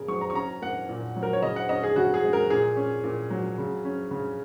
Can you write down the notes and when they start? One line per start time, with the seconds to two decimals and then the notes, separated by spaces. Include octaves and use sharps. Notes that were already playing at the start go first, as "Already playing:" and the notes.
Already playing: C#3 A#3 G#4 A#4
0.08 F#3 C#6
0.21 A#5
0.30 C#6
0.35 C#4 A#5
0.62 A#3 F#5
0.89 A#2
1.16 F#3
1.23 A#4
1.33 C#5
1.42 C#3 D#5
1.56 F#5
1.69 C#4 D#5
1.83 G#4
1.96 C#3 F#4
2.14 G#4
2.24 G#3
2.33 A#4
2.50 A#2 G#4
2.77 C#4
3.04 A#2
3.31 F#3
3.58 C#3
3.85 C#4
4.11 C#3